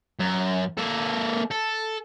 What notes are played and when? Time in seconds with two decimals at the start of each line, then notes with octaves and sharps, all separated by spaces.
0.20 F#2
0.78 A#3 A4
1.51 A4